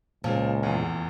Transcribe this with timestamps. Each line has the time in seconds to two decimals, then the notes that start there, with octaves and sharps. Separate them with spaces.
0.24 C#2 A#2 F3
0.63 F1 E2